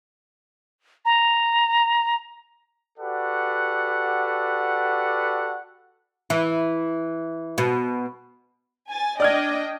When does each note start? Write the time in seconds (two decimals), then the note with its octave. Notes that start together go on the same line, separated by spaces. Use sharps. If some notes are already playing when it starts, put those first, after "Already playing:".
1.05 A#5
2.99 F#4 G4 A4 B4 D5 F#5
6.30 E3
7.58 B2
8.90 G#5 A6
9.20 D4 D5 D#5 G5 F6 G#6